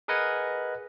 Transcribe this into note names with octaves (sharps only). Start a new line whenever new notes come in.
G#4 A#4 B4 D#5 F#5 G#5